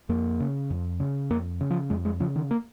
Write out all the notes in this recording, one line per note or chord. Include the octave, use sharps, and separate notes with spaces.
F2 A#3
C#3
F2
C#3
F2 A#3
C#3
F3
F2 G#3
G#3
C#3 F3
D#3
A#3